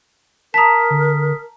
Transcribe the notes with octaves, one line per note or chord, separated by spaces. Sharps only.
A#4 A5 A#5 D#6 B6
D3